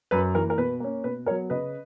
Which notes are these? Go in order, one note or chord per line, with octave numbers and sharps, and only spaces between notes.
F#2 B4
E3 A#3 A#4
A#4
B2 B4
A#3 C#4
B2 B4
F#3 B3 A#4 C#5
C#3 B4 D#5